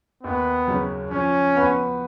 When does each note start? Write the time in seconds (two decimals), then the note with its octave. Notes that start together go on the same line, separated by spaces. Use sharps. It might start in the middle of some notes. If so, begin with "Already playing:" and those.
0.23 D#2 B3
0.67 C#3 F#3 C#4
1.10 F3 C#4
1.55 B3 F#4 B4